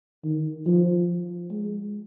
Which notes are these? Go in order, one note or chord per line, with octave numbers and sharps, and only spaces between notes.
D#3
F3
G#3